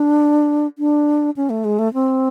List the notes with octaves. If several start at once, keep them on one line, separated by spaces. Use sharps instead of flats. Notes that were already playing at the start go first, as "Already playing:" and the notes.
Already playing: D4
D4
C#4
A3
G#3
A3
C4